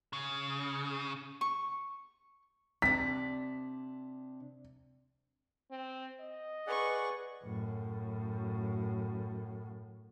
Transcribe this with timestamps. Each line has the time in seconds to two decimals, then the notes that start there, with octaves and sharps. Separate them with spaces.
0.13 C#3
1.41 C#6
2.82 C3 D4 B6
5.71 C4
6.20 D#5
6.67 G#4 B4 D5 F#5 C#6
7.44 F#2 A2